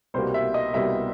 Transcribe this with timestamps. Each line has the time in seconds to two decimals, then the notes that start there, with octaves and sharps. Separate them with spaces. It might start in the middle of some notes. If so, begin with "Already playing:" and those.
0.14 C2 B2 G3 A#3 C5
0.34 E5
0.54 D#5
0.74 C2 B2 G3 A#3 E5